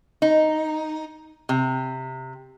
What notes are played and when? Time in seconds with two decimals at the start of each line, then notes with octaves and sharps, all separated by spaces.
0.22 D#4
1.49 C3